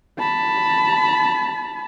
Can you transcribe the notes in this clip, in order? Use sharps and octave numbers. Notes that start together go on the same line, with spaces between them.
A5 B5